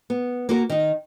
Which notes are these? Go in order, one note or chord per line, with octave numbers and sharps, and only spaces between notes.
B3
A#3 F#4 A#4
D#3 D#4